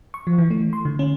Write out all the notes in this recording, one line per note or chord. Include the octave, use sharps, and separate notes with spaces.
C#6
F3
E3
A3
C6
D3
C#4